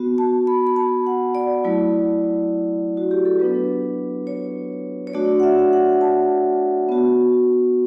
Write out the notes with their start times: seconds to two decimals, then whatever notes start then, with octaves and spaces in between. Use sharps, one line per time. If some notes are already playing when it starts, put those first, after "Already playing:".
Already playing: B3 F#4
0.18 A5
0.47 B5
0.67 B5
0.76 A5
1.07 F#5
1.35 D5
1.64 F#3 A3 E4
2.97 F#4
3.11 G4
3.25 A4
3.39 F#3 B3 D4 B4
4.27 C#5
5.07 C#5
5.13 A3 D4 F#4 D5
5.40 F#5
5.43 E5
5.73 F#5
6.01 A5
6.89 B3 F#4